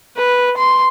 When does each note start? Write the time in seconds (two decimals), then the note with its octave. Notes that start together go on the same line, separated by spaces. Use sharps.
0.17 B4
0.57 C6